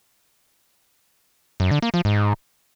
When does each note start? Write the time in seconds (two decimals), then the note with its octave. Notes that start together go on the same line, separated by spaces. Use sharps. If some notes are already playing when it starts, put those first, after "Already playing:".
1.60 F#2
1.71 D3
1.82 A#3
1.94 F3
2.05 G#2